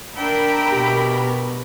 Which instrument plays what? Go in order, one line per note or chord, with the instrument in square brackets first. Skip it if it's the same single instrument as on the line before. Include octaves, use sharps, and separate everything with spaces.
[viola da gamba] D4 [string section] A#4 B5 [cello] E5 G5
[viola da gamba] B2 B3 [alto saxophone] G4